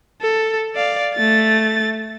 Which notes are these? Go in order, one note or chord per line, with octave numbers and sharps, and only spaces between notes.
A4
D5 F5
A3 A6